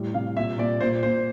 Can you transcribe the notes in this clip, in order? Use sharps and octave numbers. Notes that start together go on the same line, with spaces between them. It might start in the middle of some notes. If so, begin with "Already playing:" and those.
Already playing: A2 G3
C3 F5
A#2 E5
A#2 D5
A#2 C5
A#2 C5